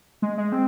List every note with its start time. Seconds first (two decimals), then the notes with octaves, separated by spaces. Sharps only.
0.22 G#3
0.38 G#3
0.52 C4